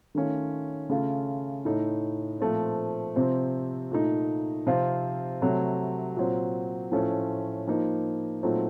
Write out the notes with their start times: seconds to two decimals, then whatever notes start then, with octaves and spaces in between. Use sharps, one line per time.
0.15 D#3 A3 C#4 F4
0.90 C#3 A3 C#4 F4
1.65 A2 A3 D#4
2.40 A#2 F3 A3 C4
3.16 C3 F3 C4
3.91 A#2 A3 D#4
4.66 C3 F3 C4 F4
5.42 C3 F#3 A3
6.16 A#2 F#3 C4
6.92 A2 F3 A3 C#4 F4
7.67 F3 A#3 D#4
8.43 A#2 F#3 A3 C4 D#4